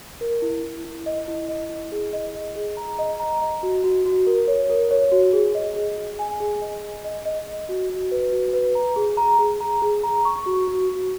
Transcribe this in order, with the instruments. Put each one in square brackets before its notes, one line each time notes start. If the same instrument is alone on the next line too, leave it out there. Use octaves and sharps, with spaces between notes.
[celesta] A#4
E4
E4
E4
D#5
E4
D#5
E4
G#4
D#5
D#5
G#4
A#5
D#5
A#5
D#5
F#4
F#4
F#4
A#4
C#5
A#4
C#5
F#4
G#4
D#5
G#4
G#4
G#5
G#4
D#5
G#4
D#5
D#5
D#5
F#4
F#4
B4
F#4
B4
A#5
G#4
A#5
G#4
A#5
G#4
A#5
C#6
F#4
F#4
F#4